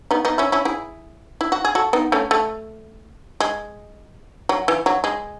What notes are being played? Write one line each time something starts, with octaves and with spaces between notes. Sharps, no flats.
B3 D#4
B3 D#4
C#4 E4
C#4 E4
E4 G#4
E4
F#4
G#4
F#4 A4
B3 D#4
A3 C#4
A3
G#3
F#3
E3
F#3
G#3